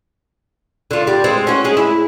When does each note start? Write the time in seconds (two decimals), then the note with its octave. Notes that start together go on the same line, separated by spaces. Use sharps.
0.91 D3 F4
1.07 G3 G4
1.24 G#3 C4
1.47 C#4 F#4
1.64 G#3 G#4
1.77 E4